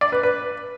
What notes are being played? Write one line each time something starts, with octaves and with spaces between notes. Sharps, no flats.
D5
B4
B4